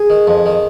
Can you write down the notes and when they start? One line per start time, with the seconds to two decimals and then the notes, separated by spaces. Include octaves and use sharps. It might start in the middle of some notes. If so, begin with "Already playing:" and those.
Already playing: G#4
0.10 D#3
0.27 F2
0.46 D#3